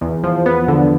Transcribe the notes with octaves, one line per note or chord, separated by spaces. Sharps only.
E2
F3
B3
D3